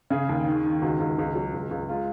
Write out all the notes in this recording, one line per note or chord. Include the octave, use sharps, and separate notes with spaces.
C#3 G#4
D#2
D#3
D#3
C#2 F#4
C#2
C#2
F#3
C#2
C#2
G#3 F4